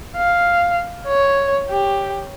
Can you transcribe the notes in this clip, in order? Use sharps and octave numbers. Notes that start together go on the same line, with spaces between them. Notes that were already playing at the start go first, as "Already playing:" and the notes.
F5
C#5
G4